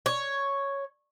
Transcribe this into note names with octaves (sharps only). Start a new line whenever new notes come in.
C#5